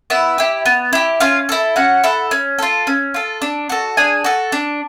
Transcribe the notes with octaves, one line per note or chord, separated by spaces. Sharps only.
B3 E4 E5
E4 G4
B3
E4 G4
C#4 F4 F5
E4 A4
C#4 F#4 F#5
E4 A4
C#4
F4 A4
C#4
F4 A4
D4
F#4 A4
D4 G#4 G#5
F#4 A4
D4